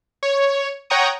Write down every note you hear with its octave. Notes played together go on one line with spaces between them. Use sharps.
C#5
C#5 F#5 G5 A#5 C#6 D#6